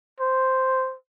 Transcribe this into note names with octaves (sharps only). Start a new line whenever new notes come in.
C5